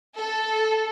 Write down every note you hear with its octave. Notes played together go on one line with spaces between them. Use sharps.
A4